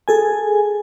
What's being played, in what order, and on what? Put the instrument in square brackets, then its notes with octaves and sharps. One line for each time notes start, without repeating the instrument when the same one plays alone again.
[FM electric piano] G#4 A4 G#5